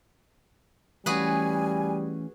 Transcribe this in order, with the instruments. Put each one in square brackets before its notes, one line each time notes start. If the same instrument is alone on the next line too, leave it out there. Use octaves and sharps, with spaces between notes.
[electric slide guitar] E3 A3 C#4 [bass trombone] G3 [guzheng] F#4 G#4 B4 [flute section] G#5